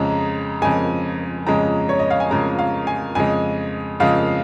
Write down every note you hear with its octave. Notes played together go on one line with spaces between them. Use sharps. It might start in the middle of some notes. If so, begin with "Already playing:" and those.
Already playing: F2 C#3 G#3 A#5
F2 C#3 G#3 G#5
F2 C#3 G#3 A#5
C#5
D#5
F5
G#5
F2 C#3 G#3 A#5
F5
G#5
F2 C#3 G#3 G#5
F2 C#3 G#3 F5